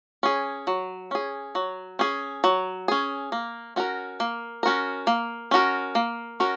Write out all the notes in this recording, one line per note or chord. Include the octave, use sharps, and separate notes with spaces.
C#4 G#4
F#3
C#4 G#4
F#3
C#4 G#4
F#3
C#4 G#4
A#3
C#4 F#4 A#4
A#3
C#4 F#4 A#4
A#3
C#4 F#4 A#4
A#3
C#4 F#4 A#4